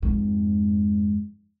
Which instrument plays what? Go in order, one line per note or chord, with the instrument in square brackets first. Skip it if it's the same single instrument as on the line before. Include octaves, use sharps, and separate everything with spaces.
[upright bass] F2 G#2